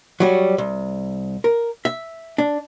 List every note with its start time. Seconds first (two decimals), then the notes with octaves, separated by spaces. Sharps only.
0.20 F#3 G3 F#4
0.58 C2
1.44 A#4
1.85 E5
2.38 D4